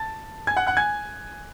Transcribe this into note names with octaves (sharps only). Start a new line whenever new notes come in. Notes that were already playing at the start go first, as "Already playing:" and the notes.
Already playing: A5 A6
G#5 G#6
F#5 F#6
F#5 F#6
G#5 G#6